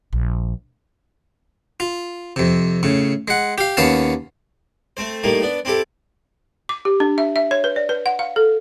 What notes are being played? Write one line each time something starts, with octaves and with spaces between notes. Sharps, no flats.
A#1
F4
F2 C3
A2 C#3
G#3 F#5
G4 F5
D#2 B3 C#4 F5 A5
A3 C4 C5
A2 D#3 G3 A3 A#3
B3 D4
C4 E4 G4 A4
D6
G4
D4
E5
E5
C#5
B4
D5
B4
F#5
F5
A4